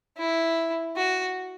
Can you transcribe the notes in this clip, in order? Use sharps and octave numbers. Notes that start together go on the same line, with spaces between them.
E4
F#4